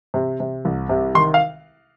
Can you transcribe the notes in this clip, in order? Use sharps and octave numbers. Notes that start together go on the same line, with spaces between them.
C3
C3
C2
C3
D#3 C6
F5